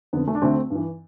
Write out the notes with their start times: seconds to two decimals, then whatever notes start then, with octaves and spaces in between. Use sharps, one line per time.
0.13 F2 D3 B3
0.27 A3
0.35 D4
0.42 D2 D3 A3 C4
0.70 G2 E3